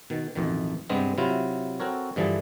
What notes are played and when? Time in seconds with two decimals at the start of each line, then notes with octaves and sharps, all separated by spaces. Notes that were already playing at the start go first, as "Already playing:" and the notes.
0.10 B2 D#3
0.35 A1 F2 B2 D#3
0.90 G2 C3 G#3 B3 C4
1.18 C3 F#3 E4 F4
1.80 C4 F#4 A4 A#4 C#5
2.16 G2 D3 E3 F3 G#4 A5